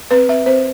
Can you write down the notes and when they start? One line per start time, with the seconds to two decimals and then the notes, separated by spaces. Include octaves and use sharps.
0.11 C4 B4
0.29 C4 E5
0.46 C4 C5